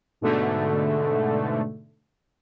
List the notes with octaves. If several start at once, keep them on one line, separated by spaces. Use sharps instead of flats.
G#2 B2 D3 A3